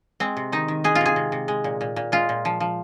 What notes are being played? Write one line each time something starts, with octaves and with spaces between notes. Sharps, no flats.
G#3 C4
C3
D#3 D#4
D#3
G#3 G#4
F4
C3 G#4
C3
C3
G#3
A#2
A#2
A#2
G#3 F4
A#2
F3
F3